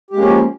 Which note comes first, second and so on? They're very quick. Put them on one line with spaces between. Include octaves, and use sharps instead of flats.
G4 G#3 A#3 C#4 F3